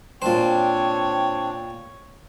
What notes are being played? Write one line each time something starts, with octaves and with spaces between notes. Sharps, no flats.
A#2 C4 D4 C5 C#5 G5